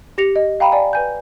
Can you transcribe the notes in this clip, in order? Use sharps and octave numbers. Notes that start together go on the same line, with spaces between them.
G4 A#6 C#7 F7
D#5
F5 G5 A#5 B5
D5 G#5
B4 G#5 G6